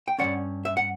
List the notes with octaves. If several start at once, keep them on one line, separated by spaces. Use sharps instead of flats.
G5
F#3 C#4 D5 F#5
G2
E5
F#5